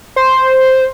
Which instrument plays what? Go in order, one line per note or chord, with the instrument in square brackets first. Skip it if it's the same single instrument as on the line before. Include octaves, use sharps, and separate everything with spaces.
[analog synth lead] C5